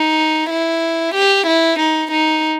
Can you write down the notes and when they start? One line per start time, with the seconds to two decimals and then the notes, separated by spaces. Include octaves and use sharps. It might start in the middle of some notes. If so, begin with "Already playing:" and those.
Already playing: D#4
0.50 E4
1.14 G4
1.47 E4
1.79 D#4
2.12 D#4